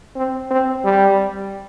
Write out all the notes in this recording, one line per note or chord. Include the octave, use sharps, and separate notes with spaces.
C4
C4
G3